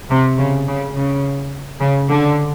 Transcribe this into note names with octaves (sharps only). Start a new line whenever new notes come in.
C3
C#3
C#3
C#3
C#3
D3